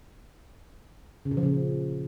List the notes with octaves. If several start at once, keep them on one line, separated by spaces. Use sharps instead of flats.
C#3
A#2
F3
C#3